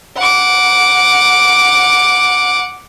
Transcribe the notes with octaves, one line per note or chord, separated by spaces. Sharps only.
F#5 D6